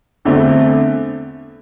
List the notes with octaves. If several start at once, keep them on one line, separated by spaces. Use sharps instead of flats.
E2 D3 A3 C4